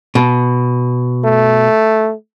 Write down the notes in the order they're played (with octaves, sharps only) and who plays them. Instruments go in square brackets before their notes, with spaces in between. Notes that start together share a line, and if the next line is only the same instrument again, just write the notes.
[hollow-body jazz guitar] B2
[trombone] A3